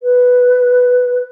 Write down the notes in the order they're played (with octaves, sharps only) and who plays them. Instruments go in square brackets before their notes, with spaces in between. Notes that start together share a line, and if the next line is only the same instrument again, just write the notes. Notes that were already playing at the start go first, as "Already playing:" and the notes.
[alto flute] B4